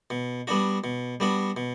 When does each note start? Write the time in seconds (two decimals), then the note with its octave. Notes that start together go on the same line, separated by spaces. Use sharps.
0.10 B2
0.47 G3 B3 D4 F#4
0.84 B2
1.20 G3 B3 D4 F#4
1.57 B2